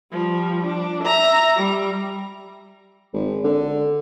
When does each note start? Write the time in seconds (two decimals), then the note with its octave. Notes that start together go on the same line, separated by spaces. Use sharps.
0.12 F3 G3
0.65 D4
1.03 E5 A#5
1.56 G3
3.13 G#1
3.44 D3